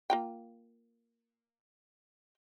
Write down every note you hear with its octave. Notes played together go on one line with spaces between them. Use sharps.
A#3 F4 G5